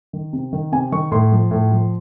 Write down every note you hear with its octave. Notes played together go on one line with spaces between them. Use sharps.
D#3
C3
D#3
C3 G#5
D#3 C#6
A2 C6
F3
A2
F3